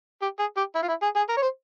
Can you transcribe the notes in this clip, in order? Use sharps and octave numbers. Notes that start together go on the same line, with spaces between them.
G4
G#4
G4
E4
F4
E4
G#4
G#4
A#4
C#5
C5